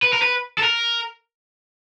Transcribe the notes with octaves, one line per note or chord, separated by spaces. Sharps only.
B4
A#4
B4
A4
A#4